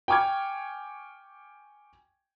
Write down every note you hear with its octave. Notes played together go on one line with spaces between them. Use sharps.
G5 G#5 C#6 D6 F6 G#6